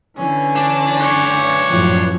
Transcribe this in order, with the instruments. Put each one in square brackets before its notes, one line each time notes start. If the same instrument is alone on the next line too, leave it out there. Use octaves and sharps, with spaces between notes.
[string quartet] D3 C#4 [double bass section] E3
[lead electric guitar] D4
[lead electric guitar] B4 D5 [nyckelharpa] C#5
[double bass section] F#2 A2 F3